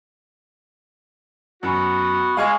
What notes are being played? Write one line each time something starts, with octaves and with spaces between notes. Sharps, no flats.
F#2 B3 F#4
G#3 F5 G#5 C#6